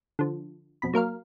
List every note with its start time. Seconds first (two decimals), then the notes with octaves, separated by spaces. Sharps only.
0.19 D3 F3
0.82 F2 B2 B5
0.93 F#3 A#3 A#4 F5